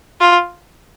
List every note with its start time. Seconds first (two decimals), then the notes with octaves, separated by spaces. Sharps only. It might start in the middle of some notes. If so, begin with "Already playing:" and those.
0.21 F4